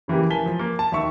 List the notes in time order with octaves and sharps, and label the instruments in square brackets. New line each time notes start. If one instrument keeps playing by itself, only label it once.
[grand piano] C#3 E3 A#3 G4
E3 A#4 G#5 A5 B6 G7
F3
A#3
A5
D#2 D#3 E5 C#6 E6